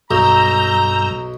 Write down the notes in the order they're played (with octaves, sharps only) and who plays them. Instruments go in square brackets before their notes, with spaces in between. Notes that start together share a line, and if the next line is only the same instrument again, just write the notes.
[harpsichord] B1 [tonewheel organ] G2 E6 G6 [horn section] A#5